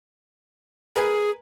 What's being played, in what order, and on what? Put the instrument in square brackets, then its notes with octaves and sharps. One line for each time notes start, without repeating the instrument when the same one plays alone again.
[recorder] G#4 [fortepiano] A#4 B4 G#5